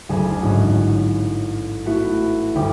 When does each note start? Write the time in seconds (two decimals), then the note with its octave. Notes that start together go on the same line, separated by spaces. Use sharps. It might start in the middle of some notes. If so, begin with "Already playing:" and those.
0.09 F#1 D2 G#4 A4 A5
0.42 A1 G#2 C#4 F#4 D#5
1.86 A3 B3 E4 F#4
2.55 G1 D2 E4 G5 D6